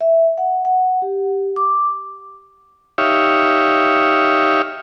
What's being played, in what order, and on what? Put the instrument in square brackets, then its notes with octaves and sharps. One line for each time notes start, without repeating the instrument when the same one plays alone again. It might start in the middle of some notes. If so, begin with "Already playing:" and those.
[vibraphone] E5
F#5
F#5
G4
D6
[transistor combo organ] D#4 G4 C#5 E5 F5